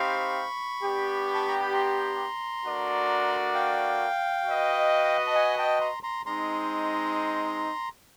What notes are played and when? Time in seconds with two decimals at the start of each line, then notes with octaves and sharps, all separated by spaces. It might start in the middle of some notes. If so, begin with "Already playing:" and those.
Already playing: C4 D#4 G4 C5 F5 B5 C#6
0.83 B3 D4 G4
1.34 A5
1.48 A#5
1.60 B5
1.73 A#5 C6
2.64 A3 D4 F#4 A#4 D5
3.54 F5 G5
4.45 F#4 B4 D#5
5.27 A5
5.35 F#5 G#5
5.58 G5 A5
5.81 A#5 C6
6.03 A#5 C6
6.26 G#3 C4 D#4 A#5 C6